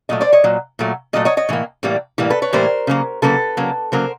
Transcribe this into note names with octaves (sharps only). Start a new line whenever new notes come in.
A#2 F#3 A3 D#5
C5 D5
C#5 D#5
A#2 F#3
A#2 F#3 A3
A#2 F#3 A3 D#5
C#5 D#5
C#5 D#5
A2 E3 A#3
A2 E3 G3 A#3
A2 E3 G3 A#3
A4 B4
B4 C#5
A2 E3 G3 A#3 A#4 C5
C#3 F#3 A#3
C#3 F#3 A#3 A4 B4
C#3 F#3 A#3
C#3 F#3 A#3 A#4 C5